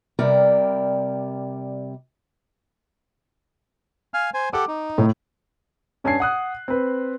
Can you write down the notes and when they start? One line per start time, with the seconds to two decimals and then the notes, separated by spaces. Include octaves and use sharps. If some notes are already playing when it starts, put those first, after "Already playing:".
0.19 C3 G3 A#4 D5 G5
4.14 F5 G#5 F6
4.34 C5 G#5
4.53 G4 A4 F#5 D6
4.68 D#4
4.98 A2
6.04 G2 C#4 G#5 A5 G#6 C7
6.20 F#5 D#6 F#6
6.68 C4 B4